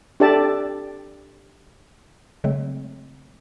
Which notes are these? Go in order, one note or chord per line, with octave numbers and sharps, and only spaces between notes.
D4 G4 A4 D5 E5 A5
C#3 F#3 G#3 A3 C4